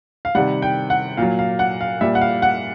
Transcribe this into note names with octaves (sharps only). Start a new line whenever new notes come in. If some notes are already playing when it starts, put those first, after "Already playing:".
F5
C3 D#3 G3 F#5
G5
F#5
A#2 F#3 F5
F5
F#5
F5
A#2 G3 E5
F#5
F5
F#5